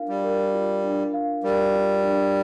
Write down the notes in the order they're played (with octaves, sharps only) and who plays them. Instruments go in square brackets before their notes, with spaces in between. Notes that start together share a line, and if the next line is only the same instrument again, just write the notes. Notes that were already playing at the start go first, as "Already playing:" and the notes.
Already playing: [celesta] D4 F4 A#4 F5
[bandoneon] G3
[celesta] A#4
F4
D4
F5
[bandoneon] G3 [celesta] A#4
[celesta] F4
D4